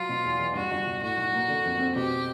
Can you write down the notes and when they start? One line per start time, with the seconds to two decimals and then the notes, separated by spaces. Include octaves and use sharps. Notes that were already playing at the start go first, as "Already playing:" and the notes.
Already playing: F#3 F4
0.09 B2
0.25 E2
0.39 E2
0.55 G2 F#4
0.71 G1
0.86 G1
1.02 A2 F#4
1.17 B1
1.33 A#3
1.48 D3
1.64 F2
1.79 C4
1.95 B2 G4